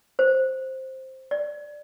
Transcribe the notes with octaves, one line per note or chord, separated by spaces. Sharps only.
C5
D5